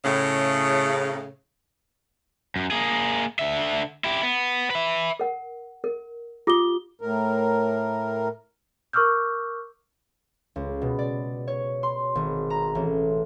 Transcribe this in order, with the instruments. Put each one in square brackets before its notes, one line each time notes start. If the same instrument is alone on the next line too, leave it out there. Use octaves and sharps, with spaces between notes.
[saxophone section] A2 C#3
[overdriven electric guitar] F#2
A#3 G#4
D3 E5
E4 G4
B3
B4 E5
[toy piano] A#4 F#5
A#4
[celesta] F4 G7 [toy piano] G4 D6 D#6
[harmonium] A2 A#4
[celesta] A#4 C#6 D6 E6 F6 G6
[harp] C#2
B2
D5
C#5
C6
G#1
A#5
A1